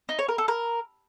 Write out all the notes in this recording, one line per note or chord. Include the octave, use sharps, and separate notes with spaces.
D#4
C#5
A#4
A4
A#4